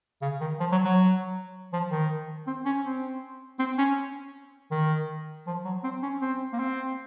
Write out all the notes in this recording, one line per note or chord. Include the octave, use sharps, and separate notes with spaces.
C#3
D#3
F3
F#3
F#3
F3
D#3
C4
C#4
C4
C4
C#4
D#3
F3
F#3
C4
C#4
C4
A#3
C4